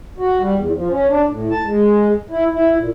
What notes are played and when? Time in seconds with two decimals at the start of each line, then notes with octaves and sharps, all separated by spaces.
0.18 F#4
0.39 G3
0.55 E2
0.75 F3
0.90 C#4
1.08 D4
1.29 A2
1.51 A5
1.65 G#3
2.30 E4
2.53 E4
2.77 A#2